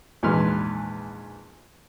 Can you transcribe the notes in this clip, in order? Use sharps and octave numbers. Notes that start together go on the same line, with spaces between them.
A#1 E2 G#2 B4 C6 F6